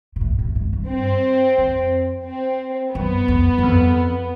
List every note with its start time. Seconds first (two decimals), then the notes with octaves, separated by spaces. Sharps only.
0.16 A#2
0.21 A2
0.39 A2
0.55 G#2
0.73 G2
0.89 C4
1.58 F2
2.26 C4
2.94 F#2 B3
3.28 F2
3.58 F#2
3.63 F2